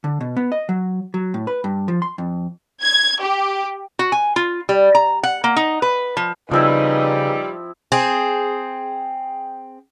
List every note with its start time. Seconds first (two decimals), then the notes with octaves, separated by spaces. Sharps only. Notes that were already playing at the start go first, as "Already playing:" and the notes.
0.04 D3
0.21 B2
0.37 B3
0.52 D#5
0.69 F#3
1.14 F#3
1.34 A2
1.47 B4
1.64 G2
1.88 F3
2.02 C6
2.18 F2
2.82 G#6
3.21 G4
3.99 F#4
4.12 G#5
4.36 F4
4.69 G3
4.95 A#5
5.23 F#5
5.44 A#3
5.56 D#4
5.82 B4
6.17 F3
6.51 C#3 F3 G3 C4 D#4 E4 B4
7.92 C4 G#4